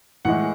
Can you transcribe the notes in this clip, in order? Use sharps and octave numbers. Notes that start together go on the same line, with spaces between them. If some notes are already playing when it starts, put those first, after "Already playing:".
A2 E3 G#3 F#5